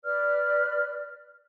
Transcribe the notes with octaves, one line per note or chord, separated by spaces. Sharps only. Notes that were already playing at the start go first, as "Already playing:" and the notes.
B4 D5 F6